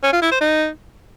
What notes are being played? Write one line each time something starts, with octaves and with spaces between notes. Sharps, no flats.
C#4
F4
E4
C5
D#4